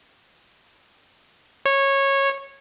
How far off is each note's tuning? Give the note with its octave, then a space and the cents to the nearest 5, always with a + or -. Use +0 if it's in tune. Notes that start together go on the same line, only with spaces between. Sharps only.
C#5 -15